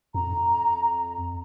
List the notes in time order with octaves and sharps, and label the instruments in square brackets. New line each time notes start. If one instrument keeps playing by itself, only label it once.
[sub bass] F2 [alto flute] A#5